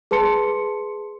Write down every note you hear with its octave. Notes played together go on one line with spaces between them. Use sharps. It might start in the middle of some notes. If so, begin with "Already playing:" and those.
G#4 B4 A5 C6 C#7